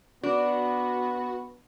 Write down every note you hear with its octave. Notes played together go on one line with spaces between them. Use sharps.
B3 D4 F#4